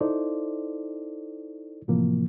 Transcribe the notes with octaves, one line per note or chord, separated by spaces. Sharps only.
D#4 E4 A4 C5 D5
A2 C3 E3 F3 A#3